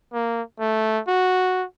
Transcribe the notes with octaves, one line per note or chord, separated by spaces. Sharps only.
A#3
A3
F#4